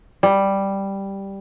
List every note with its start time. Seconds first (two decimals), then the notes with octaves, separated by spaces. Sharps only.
0.23 G3